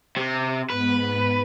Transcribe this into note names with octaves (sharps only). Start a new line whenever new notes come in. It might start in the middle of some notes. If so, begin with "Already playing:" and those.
C3
G#2 B3 B4 B5